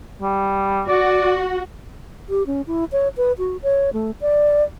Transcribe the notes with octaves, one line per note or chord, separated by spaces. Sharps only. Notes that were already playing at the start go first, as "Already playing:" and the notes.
G3
F#4 D5
G4
C#4
E4
C#5
B4
F#4
C#5
A3
D5